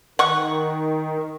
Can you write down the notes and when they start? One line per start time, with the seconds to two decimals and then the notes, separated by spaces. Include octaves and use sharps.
0.19 D#3 F#5 C#6